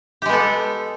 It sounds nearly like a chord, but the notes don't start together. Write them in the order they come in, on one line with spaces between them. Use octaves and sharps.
G4 G#3 B3 A4